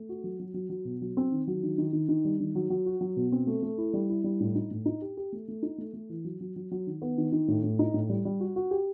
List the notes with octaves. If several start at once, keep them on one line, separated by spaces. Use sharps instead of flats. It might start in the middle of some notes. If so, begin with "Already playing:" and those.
Already playing: A3
F#4
F#3
F#3
F#3
F#3
B2
F#3
C4
D#3
F#3
D#3
D#3
D#3
D#3
G3
D#3
F#3
F#3
F#4
F#3
B2
C4
A3
A3
E4
G3
E4
G3
A2
D#4
A2
D#4
G4
G4
A3
A3
D#4
A3
A3
E3
F#3
F#3
F#3
F#3
D#3
B3
D#3
D#3
A2
A2
D#4
A2
G3
G3
F#4
F#4
G4